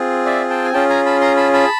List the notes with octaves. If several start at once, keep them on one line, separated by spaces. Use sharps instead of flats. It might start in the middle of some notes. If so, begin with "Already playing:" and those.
Already playing: C4 F4 G#4
D5 E5
G5 A5
G#5
C#4 F4 G#4 G5 A5
G#5 A#5
A5 B5
A#5 C6
A5 B5
A5 B5